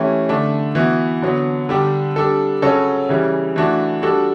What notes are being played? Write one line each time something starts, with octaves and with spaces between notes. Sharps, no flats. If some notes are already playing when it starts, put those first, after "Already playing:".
Already playing: E3 A3 C#4 G4
D3 A3 D4
E3 B3 F#4
D3 F#3 B3
D3 G3 D4 G4
G3 D4 A4
C#3 F#3 C#4 F#4 A4
C#3 E3 G3
E3 A3 D4 F#4
G3 D4 F#4 A4